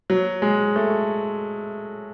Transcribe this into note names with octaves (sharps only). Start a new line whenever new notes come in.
F#3
G#3
A3